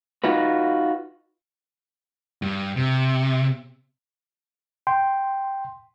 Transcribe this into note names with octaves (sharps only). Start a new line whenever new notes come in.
D#4 F4 F#4 B4
G2
C3
G5 C6